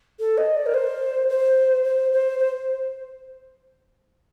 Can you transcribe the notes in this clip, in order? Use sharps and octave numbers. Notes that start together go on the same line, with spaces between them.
A4
D#5
D5
A#4
C5
C5
C5
C5
C5